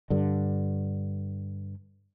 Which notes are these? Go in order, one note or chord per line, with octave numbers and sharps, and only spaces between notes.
G2 D3